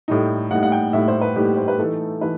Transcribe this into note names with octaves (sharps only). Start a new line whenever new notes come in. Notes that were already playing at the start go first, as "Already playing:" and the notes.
A2 G3 D#4
A2 G3 D#4 F#5
F#5
G5
A2 G3 D#4 E5
C5
B4
A2 G3 D#4 G4
C5
B4
E3 A3 D#4 A4
E3 A3 D#4 B4